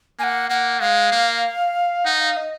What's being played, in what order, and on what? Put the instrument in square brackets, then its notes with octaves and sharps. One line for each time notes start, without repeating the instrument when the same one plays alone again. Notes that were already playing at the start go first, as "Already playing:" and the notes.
[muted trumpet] A#3 [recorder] G#5
[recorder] F#5
[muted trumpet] A#3 [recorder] F#5
[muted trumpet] G#3 [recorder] F5
[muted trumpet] A#3
[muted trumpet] D#4 [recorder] F#5
[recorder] F5
D#5